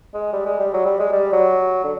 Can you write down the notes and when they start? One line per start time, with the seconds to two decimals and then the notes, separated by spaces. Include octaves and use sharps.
0.14 G#3
0.33 G3
0.46 G#3
0.59 G3
0.74 F#3
0.86 G3
0.99 G#3
1.12 G3
1.33 F#3
1.84 D3